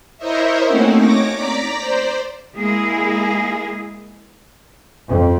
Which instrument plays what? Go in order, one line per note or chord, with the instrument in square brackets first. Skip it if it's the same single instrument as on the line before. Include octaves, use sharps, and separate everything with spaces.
[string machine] E4 A#4 C5 C#5 D#5 E5
A3 A#3 C4 C#4 D#4 F#4
C#5 D6 A#6
D5 A#5 B6
C5 D5
[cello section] G#3 A#3 E4 G#4
[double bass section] F2